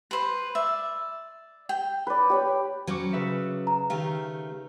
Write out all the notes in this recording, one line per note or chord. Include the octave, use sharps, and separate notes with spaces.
B4 C5
D5 E5
G5
B4 D5
G4 C#5 B5
F#3 C#4 C5 C#6 D6
C#3 B4 E5
A#5
D#3 A3 G4 F5